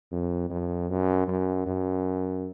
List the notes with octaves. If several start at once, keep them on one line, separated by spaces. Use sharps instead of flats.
F2
F2
F#2
F#2
F#2